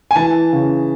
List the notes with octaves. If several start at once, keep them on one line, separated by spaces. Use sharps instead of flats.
G#5
E3 A5
C#3